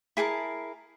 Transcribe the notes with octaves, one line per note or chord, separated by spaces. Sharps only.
E4 G#4 A#4 A5